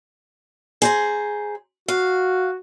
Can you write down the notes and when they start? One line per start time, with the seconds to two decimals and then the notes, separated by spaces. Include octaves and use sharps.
0.82 G#4 C5 A#5
1.88 F#4 F5